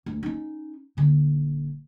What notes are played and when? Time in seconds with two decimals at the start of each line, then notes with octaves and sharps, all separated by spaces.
0.06 D2
0.23 C#4 D#4
0.97 D#1 D3